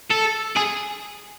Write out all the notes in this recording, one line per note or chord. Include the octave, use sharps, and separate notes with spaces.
A4
G#4